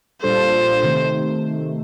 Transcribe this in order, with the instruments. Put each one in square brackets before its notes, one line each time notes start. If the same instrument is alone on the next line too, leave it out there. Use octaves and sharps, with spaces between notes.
[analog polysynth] A#2 G3 D4 F4 A4 [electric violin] C5
[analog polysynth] C3 D#3 A3